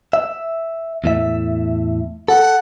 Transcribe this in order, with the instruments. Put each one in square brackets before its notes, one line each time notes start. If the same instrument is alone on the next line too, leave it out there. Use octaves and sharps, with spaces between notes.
[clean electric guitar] E5
E2 A2 E5
[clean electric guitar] A4 [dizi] F#5